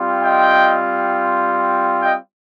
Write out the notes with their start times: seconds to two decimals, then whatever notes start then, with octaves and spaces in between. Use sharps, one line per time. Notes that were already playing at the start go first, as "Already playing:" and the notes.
Already playing: G3 C4 F4
0.23 D#5 G5
2.02 D#5 G5